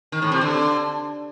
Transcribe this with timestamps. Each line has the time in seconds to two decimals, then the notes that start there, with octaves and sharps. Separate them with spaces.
0.12 D#3
0.22 A2
0.32 C3
0.41 D3